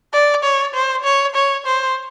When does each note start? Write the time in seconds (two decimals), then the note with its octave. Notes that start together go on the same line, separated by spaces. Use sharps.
0.13 D5
0.43 C#5
0.74 C5
1.04 C#5
1.35 C#5
1.66 C5